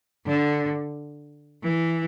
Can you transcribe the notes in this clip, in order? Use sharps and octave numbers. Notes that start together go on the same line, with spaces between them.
D3
E3